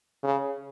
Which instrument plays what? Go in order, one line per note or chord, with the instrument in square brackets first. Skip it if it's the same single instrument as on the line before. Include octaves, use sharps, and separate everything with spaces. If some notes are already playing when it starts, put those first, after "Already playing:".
[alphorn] C#3